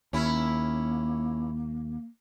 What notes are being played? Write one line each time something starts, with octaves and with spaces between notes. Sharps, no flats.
D#2 A#3 C#4 E4